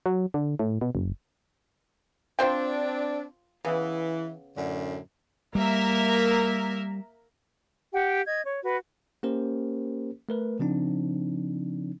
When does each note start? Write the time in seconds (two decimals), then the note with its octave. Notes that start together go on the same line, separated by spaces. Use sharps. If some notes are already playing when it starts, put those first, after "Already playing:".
0.06 F#3
0.34 D3
0.59 A2
0.81 B2
0.95 F#1
2.39 C4 D4 F4 C5 G5
3.65 C#3 E3 B3
4.56 F#2 A2 D3
5.55 G3 A#3 A#4 E5
7.92 G4 F#5 G5
8.26 D#5 G#6
8.44 C#5
8.64 F#4 B4
9.23 A#3 C#4 G4 A#4 C5
10.29 A3 A#4 B4
10.59 C#3 F3 C4 D4 D#4